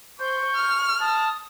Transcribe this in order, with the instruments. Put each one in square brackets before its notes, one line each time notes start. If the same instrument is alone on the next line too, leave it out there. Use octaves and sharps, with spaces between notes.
[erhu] C5 [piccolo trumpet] C#6 [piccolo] G6
[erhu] F6
[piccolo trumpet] A5 [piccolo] D#6